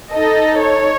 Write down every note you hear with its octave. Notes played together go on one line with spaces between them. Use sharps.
D#4 A4 D#5
C#5